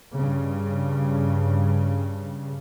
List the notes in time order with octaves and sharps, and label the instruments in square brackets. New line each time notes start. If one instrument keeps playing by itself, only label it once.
[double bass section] G2 C#3